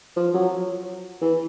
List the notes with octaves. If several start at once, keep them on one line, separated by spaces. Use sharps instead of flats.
F3
F#3
E3